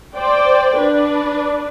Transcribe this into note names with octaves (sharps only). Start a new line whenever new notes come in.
C5 D5 G5
D4 B4